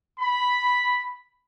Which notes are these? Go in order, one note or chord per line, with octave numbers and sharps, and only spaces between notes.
B5